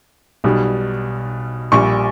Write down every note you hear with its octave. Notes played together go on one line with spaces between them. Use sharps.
B1 B2 G3
A#1 A#2 G3 C#6